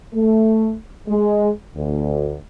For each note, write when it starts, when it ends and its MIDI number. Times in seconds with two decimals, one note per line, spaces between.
0.15 0.76 57
1.09 1.50 56
1.76 2.36 38